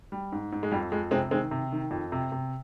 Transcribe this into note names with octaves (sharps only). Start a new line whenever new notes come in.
G3
G#2
G#2
G#3
F2 G3
F2 G#3
C3 G#3 C4
D#3 G#3 C4
C3
D#3
F2
C3
C3